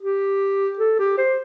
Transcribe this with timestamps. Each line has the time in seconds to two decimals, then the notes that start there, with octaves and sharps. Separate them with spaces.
0.01 G4
0.79 A4
0.99 G4
1.18 C5